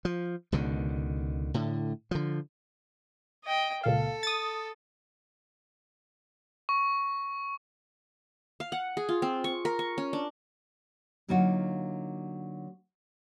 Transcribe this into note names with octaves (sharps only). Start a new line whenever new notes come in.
F3
C#2 B2 D3 D#3
A2 D3
D3 F3
D#5 G5
C#2 A#2 A4 F5
D#6 A6
C#6
F5
F#5
G#4
F4
C4
C#6
A#4
C#6
C#4
D4
D3 F#3 A#3 D#4 F4 F#4